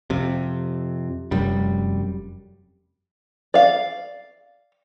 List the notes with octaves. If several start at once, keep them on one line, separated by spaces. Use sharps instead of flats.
F2 C3
F1 F#2 G3
D5 F5